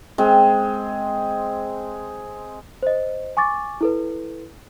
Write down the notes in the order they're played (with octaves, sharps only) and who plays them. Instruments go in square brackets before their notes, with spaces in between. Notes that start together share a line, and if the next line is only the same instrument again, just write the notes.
[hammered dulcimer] G#3 C4
[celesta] C5 D#5
G#5 C#6 D6 A6
E4 A4 B4